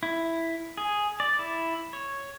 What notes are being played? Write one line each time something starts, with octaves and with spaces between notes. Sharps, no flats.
E4
G#4
D5
E4
C#5